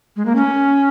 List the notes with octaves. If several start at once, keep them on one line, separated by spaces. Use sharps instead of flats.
G#3
A#3
C#4